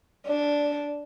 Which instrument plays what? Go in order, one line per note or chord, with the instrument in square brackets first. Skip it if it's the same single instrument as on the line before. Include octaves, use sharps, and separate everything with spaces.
[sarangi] D4